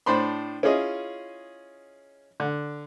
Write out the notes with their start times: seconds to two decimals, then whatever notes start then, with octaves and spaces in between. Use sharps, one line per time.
0.06 A2 D4 C5 B5 C6
0.63 C#4 E4 F4 G#4 D#5
2.40 D3